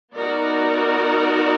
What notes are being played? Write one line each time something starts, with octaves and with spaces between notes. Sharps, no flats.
B3 D#4 F#4 A#4 D5